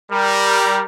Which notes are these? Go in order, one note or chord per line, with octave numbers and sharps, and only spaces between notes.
G3 A#4